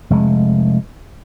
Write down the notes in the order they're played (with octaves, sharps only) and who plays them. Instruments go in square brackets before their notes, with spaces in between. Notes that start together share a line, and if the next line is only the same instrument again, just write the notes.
[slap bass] F1 G#3